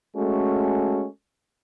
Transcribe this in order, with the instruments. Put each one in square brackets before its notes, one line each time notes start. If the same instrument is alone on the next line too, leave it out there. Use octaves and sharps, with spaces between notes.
[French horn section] G#3 A3 C#4 F#4 A4